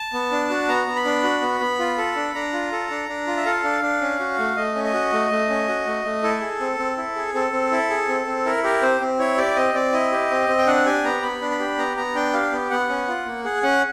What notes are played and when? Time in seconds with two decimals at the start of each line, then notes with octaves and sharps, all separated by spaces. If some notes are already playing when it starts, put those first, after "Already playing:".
Already playing: A5
0.13 B3
0.31 D4
0.50 F#4
0.68 B3 A#5
0.87 B3
0.96 B5
1.05 D4
1.23 F#4
1.42 B3
1.60 B3
1.79 F4
1.98 A4
2.16 D4
2.34 D4 A#5
2.53 F4
2.72 A4
2.90 D4
3.09 D4
3.27 F4
3.37 E5
3.46 A4 F5
3.64 D4
3.82 D4
4.01 C#4
4.20 F#4
4.38 A3
4.56 A3 D#5
4.75 C#4
4.84 D#5
4.93 F#4
5.12 A3
5.31 A3
5.49 C#4
5.68 F#4
5.86 A3
6.05 A3
6.23 E4 A4
6.41 G#4
6.60 C4
6.78 C4
6.97 E4
7.16 G#4
7.34 C4 A4
7.52 C4
7.71 E4
7.90 G#4
8.08 C4
8.27 C4
8.45 E4 A#4
8.64 G4 A#4
8.82 C4 C5
9.01 C4
9.19 E4 C#5
9.37 G4 D5
9.56 C4 D#5
9.74 C4 D5
9.93 E4 D#5
10.12 G4
10.30 C4
10.49 C4
10.58 G5
10.67 D4 F#5
10.86 G4 G#5
11.04 B3 A#5
11.22 B3 B5
11.41 D4
11.51 B5
11.59 G4
11.78 B3 A#5
11.97 B3 A#5
12.15 D4 G5
12.33 G4 F5
12.52 B3
12.70 B3 F#5
12.89 C#4
13.08 F4
13.26 A#3
13.44 G#4 F#5
13.63 C#4 F#5